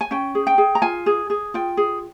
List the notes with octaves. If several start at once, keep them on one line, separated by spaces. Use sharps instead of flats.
G#5
C#4 G5
G#4
G5
G#4
A#5
F4 G#5
G#4
G#4
F4 G5
G#4